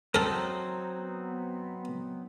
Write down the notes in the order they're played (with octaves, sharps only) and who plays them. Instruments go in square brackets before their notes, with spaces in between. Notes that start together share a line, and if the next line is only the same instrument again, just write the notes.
[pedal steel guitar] F#3 C4 D#4 [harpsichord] A4 A#4
[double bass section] B3